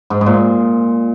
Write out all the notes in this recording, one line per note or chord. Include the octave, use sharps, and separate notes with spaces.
G#2
G#2
A#2